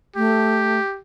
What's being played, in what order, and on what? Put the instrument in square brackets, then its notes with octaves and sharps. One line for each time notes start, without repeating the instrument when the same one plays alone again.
[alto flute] A3 [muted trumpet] G4